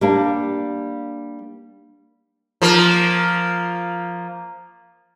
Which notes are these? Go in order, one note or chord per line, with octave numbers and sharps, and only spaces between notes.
G3 A#3 D4
F3 A#3